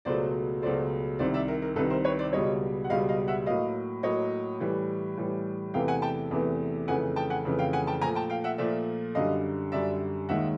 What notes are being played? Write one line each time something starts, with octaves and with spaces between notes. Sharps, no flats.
C#2 B2 F#3 A3 C5 D5
C#2 B2 F#3 A3 C5 D5
C2 C3 D#3 C5 D5
D5 E5
A#4
A#4
C2 C3 D#3 A4 B4
A#4 C5
B4 C#5
C5 D5
C#2 B2 G3 C#5 D#5
F#5
C#2 B2 G3 D#5 F5
D#5 F5
E5 F#5
A2 F#3 A#3 D#5 F5
A2 F#3 A#3 C#5 D#5
A2 E3 G3
A2 E3 G3
E2 C3 E3 A3 F5 G5
F#5 G#5
G5 A5
E2 C3 E3 A3
F2 C#3 E3 A3 F#5 G#5
G5 A5
F#5 G#5
F2 C#3 E3 A3
F5 G5
F#5 G#5
G5 A5
A#2 F3 A3 G#5 A#5
G5 A5
F5 G5
E5 F#5
A#2 F3 A3 D5 E5
F#2 D3 G3 D#5 F5
F#2 D3 G3 D5 E5
D#2 D#3 G#3 E5 F#5